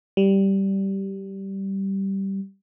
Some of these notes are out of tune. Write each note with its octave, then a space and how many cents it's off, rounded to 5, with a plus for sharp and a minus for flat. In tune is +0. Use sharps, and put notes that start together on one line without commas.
G3 -10